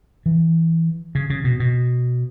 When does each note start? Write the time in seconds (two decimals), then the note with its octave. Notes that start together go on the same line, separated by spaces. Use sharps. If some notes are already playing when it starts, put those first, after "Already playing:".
0.26 E3
1.15 C#3
1.30 C#3
1.44 B2
1.60 B2